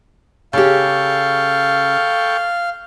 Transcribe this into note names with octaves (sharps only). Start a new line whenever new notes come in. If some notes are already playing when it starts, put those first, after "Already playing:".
C#3 G4 A4 F5 G5 C#6